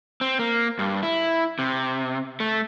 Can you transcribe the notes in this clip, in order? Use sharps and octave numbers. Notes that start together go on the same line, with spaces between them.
C4
A#3
G2
E4
C3
A3